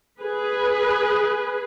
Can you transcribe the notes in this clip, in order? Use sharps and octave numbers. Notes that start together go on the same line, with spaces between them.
G#4 B4